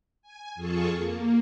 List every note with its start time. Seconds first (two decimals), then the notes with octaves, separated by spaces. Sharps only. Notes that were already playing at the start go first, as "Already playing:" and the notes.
0.22 G#5
0.55 F2 F4 G#4 A4 A5 C#6
0.96 A#3